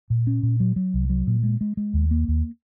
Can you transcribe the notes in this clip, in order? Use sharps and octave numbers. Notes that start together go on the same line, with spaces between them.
A#2
C#4
A#2
F#3
F#3
C2
F#3
A#2
G#3
G#3
G#3
D#2
A#3
D#2